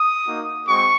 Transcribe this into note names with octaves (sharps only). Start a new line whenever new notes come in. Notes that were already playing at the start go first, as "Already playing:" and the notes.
Already playing: D#6
A#3 D#4 F#4
G#3 C4 F#4 C#6